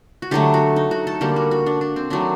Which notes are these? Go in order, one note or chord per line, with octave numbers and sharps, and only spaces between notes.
F#4
D3 F#3 A3 G4
F#4
D#4
F#4
A4
D3 G3 A#3 G4
F#4
F#4
D4
D4
C4
D#3 F#3 A3 D4